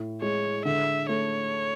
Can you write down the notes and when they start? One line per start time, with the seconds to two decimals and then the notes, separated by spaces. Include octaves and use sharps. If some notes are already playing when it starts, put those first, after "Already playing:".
Already playing: A2
0.21 G#3 C#5
0.65 D3 E5
1.08 A3 C#5